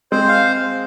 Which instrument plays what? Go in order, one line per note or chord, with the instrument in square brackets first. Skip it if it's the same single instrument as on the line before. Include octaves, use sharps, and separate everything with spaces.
[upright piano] G#3 C4 [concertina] C5
[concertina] F5